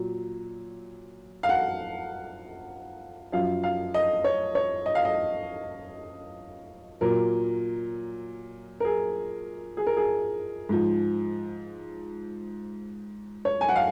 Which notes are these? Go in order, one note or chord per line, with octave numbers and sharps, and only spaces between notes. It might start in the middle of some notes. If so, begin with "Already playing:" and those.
Already playing: A#2 F#3
F5
F#5
F#2 F3 F5
F5
D#5
C#5
C#5
D#5
F5
D#5
A#2 F#3 A#4
A#4
G#4
G#4
A#4
G#4
G#2 F3
C#5
G#5
F#5
F5